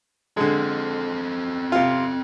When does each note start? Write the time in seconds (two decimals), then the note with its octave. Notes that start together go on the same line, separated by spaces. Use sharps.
0.37 D3 G#3 C4 A4
1.72 C3 F4